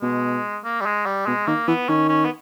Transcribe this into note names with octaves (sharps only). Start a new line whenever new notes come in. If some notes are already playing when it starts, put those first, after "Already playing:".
B2 G#3
A#3
G3
G#3
G3
B2 G#3
D#3 A#3
E3 B3
D#3 C#4
C#4
B3